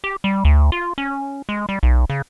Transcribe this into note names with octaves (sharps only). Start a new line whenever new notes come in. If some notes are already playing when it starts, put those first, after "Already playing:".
G4
G3
D2
F4
C#4
G#3
G3
B1
C#3